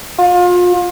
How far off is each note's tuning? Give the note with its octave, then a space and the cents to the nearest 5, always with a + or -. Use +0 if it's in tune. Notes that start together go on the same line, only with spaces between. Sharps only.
F4 +30